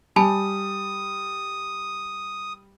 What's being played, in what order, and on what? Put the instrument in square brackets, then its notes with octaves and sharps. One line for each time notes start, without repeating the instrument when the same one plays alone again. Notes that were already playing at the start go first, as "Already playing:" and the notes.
[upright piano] G3 [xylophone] G#5 A5 B5 [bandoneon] D#6